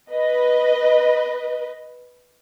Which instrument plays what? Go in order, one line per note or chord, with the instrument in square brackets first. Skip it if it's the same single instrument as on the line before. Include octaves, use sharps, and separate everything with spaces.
[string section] B4 D#5